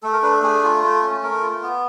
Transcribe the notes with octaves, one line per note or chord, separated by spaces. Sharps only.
A3 A4
A#4
D4 B4
A4
A3 G#4
F4
A3
C#4
A3 A#4
F4
B3